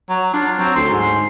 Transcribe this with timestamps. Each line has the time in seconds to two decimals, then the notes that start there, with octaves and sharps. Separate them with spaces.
0.09 F#3
0.33 D4 F4
0.59 F#3 C4
0.76 D2 C6
0.91 G#2